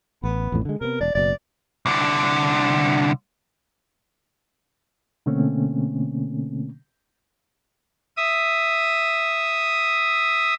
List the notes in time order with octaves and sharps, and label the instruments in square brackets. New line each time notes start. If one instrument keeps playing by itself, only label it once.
[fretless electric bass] A1 [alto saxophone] B3
[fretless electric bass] A1 F2 A2
D3 G#3
[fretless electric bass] C3 B3 [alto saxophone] A#4
[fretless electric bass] E1 [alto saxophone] D5
[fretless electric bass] F#1 B2 [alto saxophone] D5
[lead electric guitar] C2 D3
[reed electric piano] B2 D3 A3 A#3 C4 C#4
[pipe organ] E5 D#6